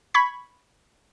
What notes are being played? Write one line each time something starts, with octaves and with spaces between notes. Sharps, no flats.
B5 C#6 G#6 B6